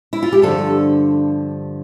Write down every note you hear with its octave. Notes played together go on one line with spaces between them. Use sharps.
E4
F4
G4
G2 D3 F3 A4